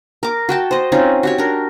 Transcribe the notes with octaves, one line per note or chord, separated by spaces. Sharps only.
A#4 D6
F#4 G5 A5
C5 D#5
C4 C#4 D#4 F4
F#4 G4 C#5
D4 A#4